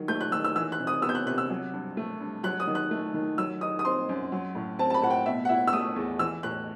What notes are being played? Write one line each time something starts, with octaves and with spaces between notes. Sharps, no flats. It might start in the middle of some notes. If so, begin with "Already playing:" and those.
Already playing: D#3 F#3
A3 G6
F#6
D#3 E6
E6
E3 E6
F#6
C3
D#6
B3 E6
G6
F#6
C3 F#6
E6
F#3
G2
A3
G2
F#3 F#6
D#6
D#3
F#6
A3
D#3
F#3 E6
D#4 D#6
D#6
C4 C6
F#2
F#3
A2
C4 A5
A5
B5
A2 F#5
G5
B2 E5
F#5
E4 E5
E6
A3 D#6
E2
E3 E6
A2 F#6